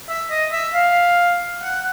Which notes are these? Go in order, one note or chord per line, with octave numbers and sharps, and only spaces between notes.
E5
D#5
E5
F5
F#5